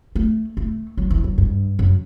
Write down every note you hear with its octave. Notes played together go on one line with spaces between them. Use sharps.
A3
A3
F#3
E3
F#3
G2
F#2